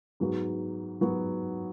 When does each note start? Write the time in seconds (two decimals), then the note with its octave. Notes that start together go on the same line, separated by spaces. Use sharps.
0.20 G#2 F#3 B3 F#4
1.01 G#2 F#3 B3 F#4